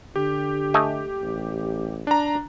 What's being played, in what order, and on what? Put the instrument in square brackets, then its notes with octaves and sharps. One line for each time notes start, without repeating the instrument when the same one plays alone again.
[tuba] D3 [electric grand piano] G4
[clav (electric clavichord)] A3 D#5 G#5
[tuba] A1
[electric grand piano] D4 A#5